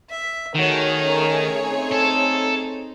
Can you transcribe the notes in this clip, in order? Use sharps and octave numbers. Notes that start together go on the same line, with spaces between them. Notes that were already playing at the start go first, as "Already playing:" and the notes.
E5
D#3 A3 F#4 G#4 C#5
C#4 A#4
C4 D#4
A4